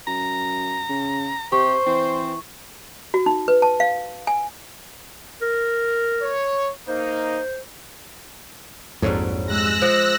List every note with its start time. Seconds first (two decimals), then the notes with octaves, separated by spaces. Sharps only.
0.07 F#2 A#5
0.89 C#3
1.52 C3 G4 C5 C#6
1.86 E3 C4
3.14 F#4
3.26 D#4
3.48 B4
3.62 A5
3.80 F5
4.27 G#5
5.42 A#4
6.22 C#5
6.88 A#3 D#4 C5
9.02 A#1 F2 G#2 F#3 G3
9.46 G#3 E6 F#6 A#6
9.82 F3